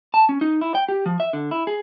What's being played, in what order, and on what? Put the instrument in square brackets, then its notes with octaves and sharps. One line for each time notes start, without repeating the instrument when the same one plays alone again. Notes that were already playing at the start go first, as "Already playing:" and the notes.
[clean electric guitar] A5
C#4
D#4
E4
G5
G4
F3
E5
D3
E4
G#4